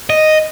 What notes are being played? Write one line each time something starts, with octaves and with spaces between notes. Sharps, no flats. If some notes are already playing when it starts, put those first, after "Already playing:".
D#5